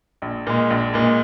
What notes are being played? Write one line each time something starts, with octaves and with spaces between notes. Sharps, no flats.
A#1
A#2 G#3
A#1
A#2 G#3